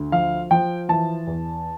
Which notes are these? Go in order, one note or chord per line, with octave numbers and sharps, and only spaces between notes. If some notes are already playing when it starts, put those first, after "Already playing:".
Already playing: D2
F3 F5
F3 G5
E3 A5
E2